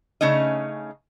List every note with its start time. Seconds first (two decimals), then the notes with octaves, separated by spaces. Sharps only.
0.21 C#3 A3 C#4 D#4 D#5